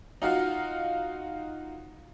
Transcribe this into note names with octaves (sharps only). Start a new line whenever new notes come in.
D#4 F4 F#4 F5